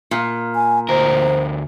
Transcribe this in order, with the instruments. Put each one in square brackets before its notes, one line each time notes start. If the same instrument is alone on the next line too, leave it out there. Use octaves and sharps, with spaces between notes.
[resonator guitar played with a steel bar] A#2
[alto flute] G#5
[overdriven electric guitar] D2 A#4 [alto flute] C5